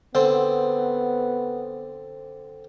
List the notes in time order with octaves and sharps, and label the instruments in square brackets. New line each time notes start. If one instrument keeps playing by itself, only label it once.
[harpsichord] D3 C4 C6 [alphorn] B3